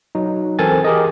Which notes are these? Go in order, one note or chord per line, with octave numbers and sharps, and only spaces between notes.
F#3 D#4
E3 C4 A4 A#4 G#5 A6
G4 G#4 A#4 D#5